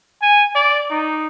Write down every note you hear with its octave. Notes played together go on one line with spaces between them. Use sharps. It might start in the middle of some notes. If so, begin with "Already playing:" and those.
G#5
D5
D#4